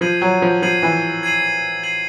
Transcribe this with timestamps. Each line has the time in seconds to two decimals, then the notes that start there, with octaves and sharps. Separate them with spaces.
0.01 F3 G#6 C7 D#7 F#7
0.21 F#3
0.42 F3
0.62 F3 G#6 C7 D#7 F#7
0.83 E3
1.23 G#6 C7 D#7 F#7
1.83 G#6 C7 D#7 F#7